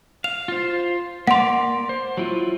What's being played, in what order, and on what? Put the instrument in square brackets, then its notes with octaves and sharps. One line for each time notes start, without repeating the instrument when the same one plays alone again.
[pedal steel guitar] F5 [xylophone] F7
[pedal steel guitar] F4 C5
[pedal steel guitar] A#3 D5 D6 [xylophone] F#5 C6
[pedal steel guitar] C5
F#3 E4 F4